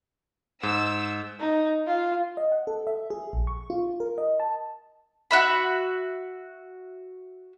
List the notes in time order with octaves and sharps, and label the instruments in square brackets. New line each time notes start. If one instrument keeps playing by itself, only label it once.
[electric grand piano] G#2 [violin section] E6
[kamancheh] D#4
F4
[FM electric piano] D#5
F#5
A4
E5
G#4
A#1
C#6
F4
A#4
D#5
A5
[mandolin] F#4 E5 B5